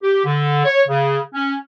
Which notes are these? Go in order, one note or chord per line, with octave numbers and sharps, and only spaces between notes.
G4
D3
C#5
C#3
C#4